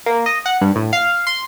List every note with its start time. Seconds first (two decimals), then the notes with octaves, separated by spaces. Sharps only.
0.06 A#3
0.26 D#5
0.46 F#5
0.61 G2
0.76 A2
0.93 F5
1.27 C6